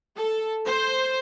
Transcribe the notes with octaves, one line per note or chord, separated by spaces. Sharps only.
A4
C5